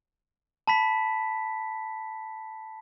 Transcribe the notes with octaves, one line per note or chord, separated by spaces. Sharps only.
A5 B5 B6